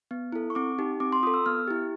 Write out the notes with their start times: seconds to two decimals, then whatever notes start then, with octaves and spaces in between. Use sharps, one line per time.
0.11 B3
0.32 E4 A4
0.50 C#6
0.55 C4 D6
0.79 D#4 G4
1.00 C4 D6
1.12 C6
1.23 F4 D#6
1.27 A4
1.34 E6
1.46 B3 F6
1.68 E4 G4